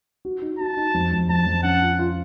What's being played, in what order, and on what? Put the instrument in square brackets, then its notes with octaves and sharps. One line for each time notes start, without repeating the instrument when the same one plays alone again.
[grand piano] F#4
D#4
[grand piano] F#4 [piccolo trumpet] A5
[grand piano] D#4
F2
F2
[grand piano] F2 [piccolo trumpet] A5
[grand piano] F2
[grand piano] C#4 [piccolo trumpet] F#5
[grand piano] F4
F4